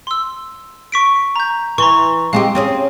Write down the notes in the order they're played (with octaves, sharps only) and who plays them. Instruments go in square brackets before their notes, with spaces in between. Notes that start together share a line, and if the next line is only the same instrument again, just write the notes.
[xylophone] C6 E6
C#6 B6 D7
A#5 G6
[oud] E3 [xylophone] A#5 C6 C#6
[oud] G#3 C4 G4 [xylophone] F5
[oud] C4 C#4 G#4